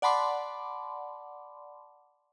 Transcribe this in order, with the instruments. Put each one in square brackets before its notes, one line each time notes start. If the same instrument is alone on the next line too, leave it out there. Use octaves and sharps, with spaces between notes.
[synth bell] D5 F#5 A5 B5 C6 D6